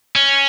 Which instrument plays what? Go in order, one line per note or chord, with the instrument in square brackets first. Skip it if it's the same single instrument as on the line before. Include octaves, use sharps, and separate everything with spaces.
[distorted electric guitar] C#4